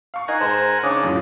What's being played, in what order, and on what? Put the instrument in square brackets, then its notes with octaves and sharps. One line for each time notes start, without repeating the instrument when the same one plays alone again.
[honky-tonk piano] F5 C#6
[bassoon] D#4 [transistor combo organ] A#4 F#5 G#5
[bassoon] G#2 [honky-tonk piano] C5 A#5
[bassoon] C#3 [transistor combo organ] D4 D#4 [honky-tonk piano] G#5 C#6 D6
[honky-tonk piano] F#2 A2 F4